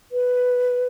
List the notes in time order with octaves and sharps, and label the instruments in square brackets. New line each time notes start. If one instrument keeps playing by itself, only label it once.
[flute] B4